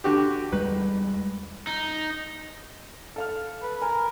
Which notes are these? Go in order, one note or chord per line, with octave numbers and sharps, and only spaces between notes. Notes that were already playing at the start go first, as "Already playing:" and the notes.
D3 F#4 G4
E2 G3 G#3 B4
D#4
A4 F5 F6
B4
A#4 G#5